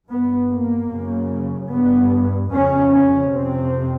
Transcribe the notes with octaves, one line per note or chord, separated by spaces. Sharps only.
G2 B3
A#3
F#2 C#3
G2 B3
F2 C#3 C#4
C#4
F2 C3 C4